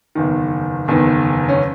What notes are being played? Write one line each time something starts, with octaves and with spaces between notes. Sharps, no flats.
F#1 E2 D#3
F#1 E2 D#3
C#4